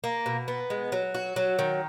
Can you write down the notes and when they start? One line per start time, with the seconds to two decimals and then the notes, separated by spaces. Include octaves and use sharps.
0.04 A#3
0.26 B2
0.48 B3
0.70 G#3
0.92 F#3
1.14 F#4
1.36 F#3
1.59 D#3